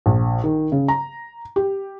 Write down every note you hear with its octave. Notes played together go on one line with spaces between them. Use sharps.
A#1
D#3
C#3
A#5
G4